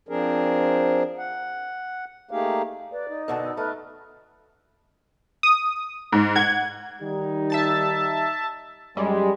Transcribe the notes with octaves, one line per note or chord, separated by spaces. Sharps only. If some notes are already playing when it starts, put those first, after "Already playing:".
F3 C4 D4 G#4 A#4
F#5
A3 A#3 D#4 G4 G#4 F5
B4 D5
D#4
F#2 B2 D3 F#5 A5
E6
A3 B4 B5 F6
D#6
G#2
F#5 G#6
D#3 G3 D#4
E5 A5 A6
F#2 G3 G#3